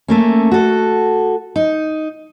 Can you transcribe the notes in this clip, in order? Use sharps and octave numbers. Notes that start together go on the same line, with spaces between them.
A3 A#3 C#4
F#4 A4
D#4